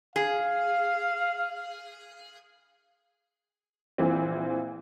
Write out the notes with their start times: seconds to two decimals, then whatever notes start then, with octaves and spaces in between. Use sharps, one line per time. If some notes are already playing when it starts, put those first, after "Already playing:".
0.16 G#4 F5
3.98 A#1 A#2 E3 C4